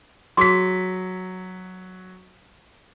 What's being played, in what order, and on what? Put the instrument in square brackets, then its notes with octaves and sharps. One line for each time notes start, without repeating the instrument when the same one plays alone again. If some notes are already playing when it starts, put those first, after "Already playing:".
[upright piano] F#3 B6 [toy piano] G#4 C6